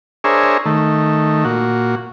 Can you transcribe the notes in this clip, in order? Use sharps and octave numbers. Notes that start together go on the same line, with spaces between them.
D4 G#4 A#4 C5 C#5 E5
D#3 A3
A#2 F#4